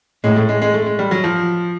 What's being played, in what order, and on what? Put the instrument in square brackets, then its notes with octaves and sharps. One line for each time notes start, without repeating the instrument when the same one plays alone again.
[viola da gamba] A2 [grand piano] G#3
[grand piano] A3
G#3
G#3
A3
G#3
G3
F#3
F3